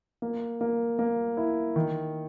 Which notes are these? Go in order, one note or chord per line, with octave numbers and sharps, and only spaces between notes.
A#3
A#3
A#3
E4
D#3